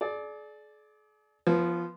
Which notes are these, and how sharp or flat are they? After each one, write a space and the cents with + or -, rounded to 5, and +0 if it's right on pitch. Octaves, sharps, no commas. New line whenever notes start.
G#4 +45 D5 +0
F3 -15 B3 -15 C5 +25